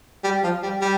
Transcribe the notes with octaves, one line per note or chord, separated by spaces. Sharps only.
G3
F3
G3
G3